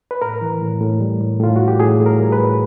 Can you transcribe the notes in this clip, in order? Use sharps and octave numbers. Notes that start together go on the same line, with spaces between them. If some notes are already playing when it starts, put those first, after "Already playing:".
B4
A2 A#4
E3
A2
A2
G3
A2
A2 F4
A2 F#4
G4
A2 G#4
A2
A#4
G3
B4
A2